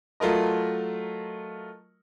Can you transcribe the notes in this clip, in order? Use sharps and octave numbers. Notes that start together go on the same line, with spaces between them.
F#3 A3 F4 A#4 D#5